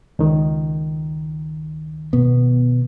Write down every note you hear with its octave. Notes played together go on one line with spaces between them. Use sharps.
C#2 D#3
B2 B3